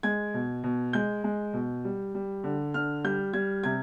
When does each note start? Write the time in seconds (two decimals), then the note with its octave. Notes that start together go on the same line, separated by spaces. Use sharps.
0.03 G#3 G#6
0.34 B2
0.64 B2
0.93 G#3 G6
1.24 G#3
1.53 B2
1.85 G3
2.15 G3
2.44 D3
2.74 D3 F6
3.04 G3 G6
3.34 G3 G#6
3.64 C3 G#6